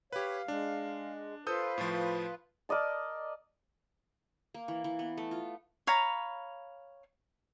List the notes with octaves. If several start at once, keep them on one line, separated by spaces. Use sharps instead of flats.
G4 B4 C#5 F5
G#3 D4
F4 A4 B4 C5 D#6 G6
A2 F3
A#4 D5 D#5 A5
A#3
E3
E3
B3
A3
F4
C#5 F5 A#5 B5